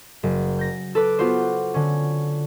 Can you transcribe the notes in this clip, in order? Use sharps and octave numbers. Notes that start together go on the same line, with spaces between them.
F#1
G6 A#6
A4 B4 D6
B3 F4 F#4 C5
D3 C#4